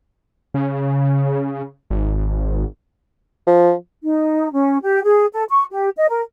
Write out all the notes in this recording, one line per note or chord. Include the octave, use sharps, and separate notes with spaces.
C#3
G#1
F3
D#4
C#4
G4
G#4
A4
C#6
G4
D#5
A#4